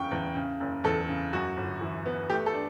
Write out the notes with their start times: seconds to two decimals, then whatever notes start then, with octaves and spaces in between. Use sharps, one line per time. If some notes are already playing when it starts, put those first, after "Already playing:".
Already playing: F#1 E2 C#3 G5 C#6
0.11 E2
0.35 C#3
0.60 F#1
0.84 E2 A4
1.08 C#3
1.33 F#2 F#4
1.57 G1
1.81 E3
2.06 B3
2.30 A3 G4
2.46 A4
2.53 D4